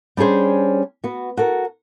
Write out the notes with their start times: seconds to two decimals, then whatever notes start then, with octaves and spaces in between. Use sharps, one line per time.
0.17 G3 C#4 D4 G#4 C5
1.04 B3 F#4
1.37 F#4 A4 A#4